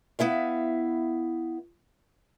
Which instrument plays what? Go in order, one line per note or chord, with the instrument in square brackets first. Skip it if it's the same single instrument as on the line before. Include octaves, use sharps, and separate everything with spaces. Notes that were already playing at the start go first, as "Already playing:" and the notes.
[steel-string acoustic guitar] B3 E4 E5 F5